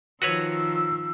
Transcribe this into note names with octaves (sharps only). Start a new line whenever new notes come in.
D#3 F3 F#4 B4 C#5 E6